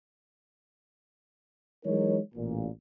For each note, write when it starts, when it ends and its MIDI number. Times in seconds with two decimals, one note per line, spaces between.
1.85 2.18 52
1.85 2.18 54
1.85 2.18 56
1.85 2.18 63
1.85 2.18 70
1.85 2.18 73
2.35 2.67 33
2.35 2.67 46